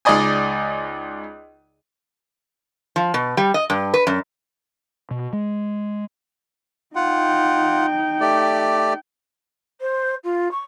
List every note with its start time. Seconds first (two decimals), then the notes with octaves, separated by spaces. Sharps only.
0.05 C#2 D#4 G#4 D5 D#5 G#5
2.96 F3
3.14 B2
3.37 G3
3.54 D#5
3.70 G2
3.94 B4
4.07 F#2
5.11 B2
5.33 G#3
6.96 D#4 F4 F#5 G5
8.21 A3 G4 D5
9.80 C5
10.23 F4
10.51 C#6